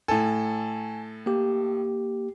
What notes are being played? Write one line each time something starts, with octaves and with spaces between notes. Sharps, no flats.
A2 A4 G#5
A#3 G4